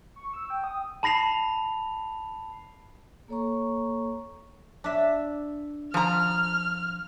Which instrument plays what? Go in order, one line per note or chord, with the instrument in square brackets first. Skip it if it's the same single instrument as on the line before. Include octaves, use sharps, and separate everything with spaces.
[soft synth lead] C#6
E6
G5
D#6
[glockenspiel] A5 B5 A#6 C7 F7
[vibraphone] A#3 A4 C#5 A#5 C#6
[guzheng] D4 E5
[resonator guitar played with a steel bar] F3 A#5 [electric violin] F6